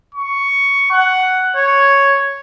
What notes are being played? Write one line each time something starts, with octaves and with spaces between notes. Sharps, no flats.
C#6
F#5
C#5